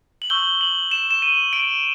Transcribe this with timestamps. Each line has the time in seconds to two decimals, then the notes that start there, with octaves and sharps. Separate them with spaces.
0.22 F#7
0.30 C#6 E6 G6 G7
0.61 F#7
0.91 E7
1.11 E7
1.22 D#7
1.53 D7